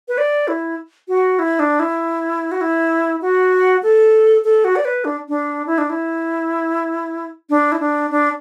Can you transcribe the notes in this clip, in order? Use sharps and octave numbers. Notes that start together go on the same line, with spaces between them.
B4
D5
E4
F#4
E4
D4
E4
F#4
E4
F#4
A4
A4
F#4
D5
B4
D4
D4
E4
D4
E4
D4
E4
D4
D4